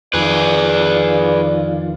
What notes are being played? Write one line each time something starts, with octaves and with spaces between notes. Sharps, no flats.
F2 D#3 F4 G#4 B4 D5